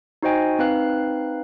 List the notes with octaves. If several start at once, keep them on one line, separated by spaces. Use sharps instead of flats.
D#4 F#4 C5 D#5 G5 G#5
C4 D#4 B4 F5 F#6